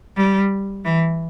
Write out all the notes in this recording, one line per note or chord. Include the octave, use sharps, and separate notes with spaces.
G3
E3